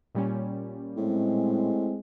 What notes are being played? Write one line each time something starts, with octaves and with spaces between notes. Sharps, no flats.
A#2 G3 C#4
A2 G#3 C4